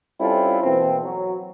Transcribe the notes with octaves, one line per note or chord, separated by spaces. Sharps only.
G3 C4 C#4 E4 F4 A4
B2 E3 A#3 C4
F#3